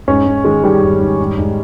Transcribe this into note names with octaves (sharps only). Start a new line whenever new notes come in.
G#2 C#4
G#2
D#3 G#3
D#3 G3
G#2
G#2
G#2
G#2